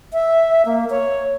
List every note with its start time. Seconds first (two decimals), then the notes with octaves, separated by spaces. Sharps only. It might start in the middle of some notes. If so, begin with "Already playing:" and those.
0.13 E5
0.65 A#3
0.90 C#5